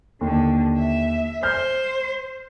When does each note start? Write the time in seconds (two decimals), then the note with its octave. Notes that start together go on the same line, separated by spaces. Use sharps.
0.21 D#2 D3
0.78 E5
1.43 C5 F6 G6